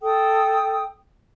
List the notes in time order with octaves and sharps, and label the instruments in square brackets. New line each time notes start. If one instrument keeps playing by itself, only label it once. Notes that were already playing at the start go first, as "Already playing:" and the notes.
[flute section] A4 G5 D#6